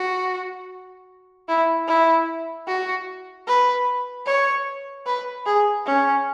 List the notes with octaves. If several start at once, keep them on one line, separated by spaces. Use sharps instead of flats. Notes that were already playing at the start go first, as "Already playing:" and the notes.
Already playing: F#4
E4
E4
F#4
B4
C#5
B4
G#4
C#4